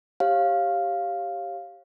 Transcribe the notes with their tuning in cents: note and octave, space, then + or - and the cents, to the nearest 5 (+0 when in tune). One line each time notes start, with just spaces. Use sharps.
G4 +0 C#5 -30 F5 +0